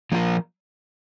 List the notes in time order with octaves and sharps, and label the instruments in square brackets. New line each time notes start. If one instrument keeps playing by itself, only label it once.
[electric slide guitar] F3 A#3 F4 A#4